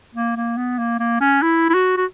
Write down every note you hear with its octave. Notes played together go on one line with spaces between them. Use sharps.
A#3
A#3
B3
A#3
A#3
C#4
E4
E4
F#4
F#4